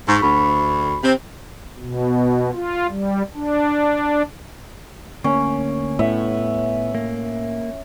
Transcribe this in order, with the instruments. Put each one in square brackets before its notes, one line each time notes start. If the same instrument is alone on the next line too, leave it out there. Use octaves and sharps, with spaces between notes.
[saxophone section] G#2 [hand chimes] C#6 B6
[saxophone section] D2 [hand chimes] B5 C#6
[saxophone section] C3 C4
[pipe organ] B2
F4
G3
D4
[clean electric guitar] D2 A#3 [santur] C#4
[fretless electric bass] A2 [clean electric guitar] B3 [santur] E5
[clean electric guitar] A#3